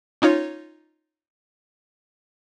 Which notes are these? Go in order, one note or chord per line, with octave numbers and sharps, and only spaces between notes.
C#4 D#4 F4 C#5